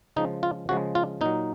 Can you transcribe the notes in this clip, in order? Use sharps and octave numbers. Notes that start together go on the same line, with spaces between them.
C#3 F3 G#3 D#4
F4
C#3 F3 G#3 F#4
F4
A#2 F#3 D#4